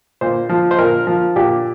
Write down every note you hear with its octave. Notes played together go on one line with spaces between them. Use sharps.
A#2 C5
F3
C5
A#2 A#4
F3
A#2 G4